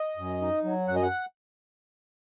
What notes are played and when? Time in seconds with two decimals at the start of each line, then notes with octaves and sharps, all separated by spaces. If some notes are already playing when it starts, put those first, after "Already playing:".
Already playing: D#5
0.17 F#2
0.41 D#4
0.64 F#3
0.88 F#2 F#5
0.96 D#5
1.03 F#5